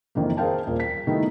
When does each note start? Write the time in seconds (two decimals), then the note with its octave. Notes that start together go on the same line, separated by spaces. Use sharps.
0.15 F2 D#3 E3 A#3
0.37 G#4 A#4 C5 F5 G5 A5
0.67 D#1 A#2 F4 A#4
0.80 B6
1.07 D#3 G3 A3 B3 D#4 E4